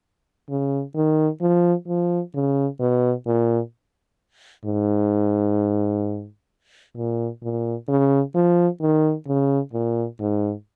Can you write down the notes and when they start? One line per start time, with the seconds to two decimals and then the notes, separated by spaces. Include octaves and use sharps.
0.49 C#3
0.96 D#3
1.41 F3
1.88 F3
2.34 C#3
2.80 B2
3.27 A#2
4.65 G#2
6.96 A#2
7.43 A#2
7.88 C#3
8.35 F3
8.81 D#3
9.27 C#3
9.73 A#2
10.20 G#2